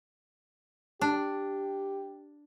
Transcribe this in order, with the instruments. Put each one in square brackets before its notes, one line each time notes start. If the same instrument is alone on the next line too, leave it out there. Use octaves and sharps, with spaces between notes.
[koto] D4 [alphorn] G4